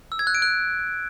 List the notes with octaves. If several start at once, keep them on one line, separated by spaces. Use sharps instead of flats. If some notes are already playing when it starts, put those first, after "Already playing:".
E6
G#6
F#6
D7
F#6